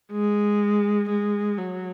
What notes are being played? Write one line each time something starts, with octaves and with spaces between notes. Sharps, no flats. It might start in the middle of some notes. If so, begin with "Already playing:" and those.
G#3
G#3
F#3